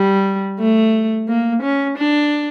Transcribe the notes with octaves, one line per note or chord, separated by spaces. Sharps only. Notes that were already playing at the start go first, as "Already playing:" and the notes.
Already playing: G3
A3
A#3
C#4
D4